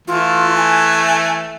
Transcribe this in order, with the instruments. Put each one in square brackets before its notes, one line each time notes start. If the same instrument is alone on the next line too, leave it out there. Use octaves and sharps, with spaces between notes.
[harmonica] E3 A3 [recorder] F4
[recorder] G#5